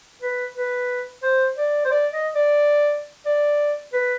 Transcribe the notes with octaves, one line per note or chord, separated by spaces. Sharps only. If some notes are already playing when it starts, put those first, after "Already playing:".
B4
B4
C5
D5
C5
D5
D#5
D5
D5
B4